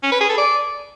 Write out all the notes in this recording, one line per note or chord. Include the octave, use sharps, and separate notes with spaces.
C#4
B4
G#4
A4
D5